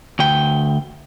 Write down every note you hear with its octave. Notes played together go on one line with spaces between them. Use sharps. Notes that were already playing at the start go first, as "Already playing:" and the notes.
D2 G5